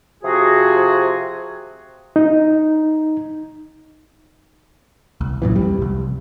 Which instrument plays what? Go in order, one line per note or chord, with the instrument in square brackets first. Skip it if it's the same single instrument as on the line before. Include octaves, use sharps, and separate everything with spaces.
[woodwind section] C3 F3 F#4 G#4
[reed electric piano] D#4
[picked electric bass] C2
A#1 F#2 A#2 E3
F2 G3
C2